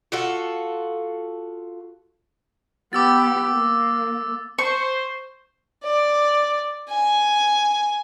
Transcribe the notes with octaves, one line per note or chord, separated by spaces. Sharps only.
F4 F#4 A4
B3 G4 D6 E6 A6
A#3
C5 C#6
D5
G#5